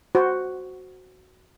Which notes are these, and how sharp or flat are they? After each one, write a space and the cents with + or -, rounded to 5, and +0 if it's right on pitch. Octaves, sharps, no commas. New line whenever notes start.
F#4 +0 C5 -5